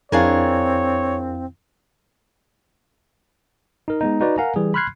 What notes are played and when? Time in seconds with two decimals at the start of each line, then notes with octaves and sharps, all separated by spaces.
0.12 F2 C4 D4 E4 G#4 A#4 C#5 F5
3.88 D#4 A#4
4.01 G#3 B3 D#4
4.21 D#4 F#4 B4 D5
4.38 A#4 F5 F#5 G#5 A#5
4.56 E3 G3 G#4
4.74 B5 C6 F6 F#6 G#6 C7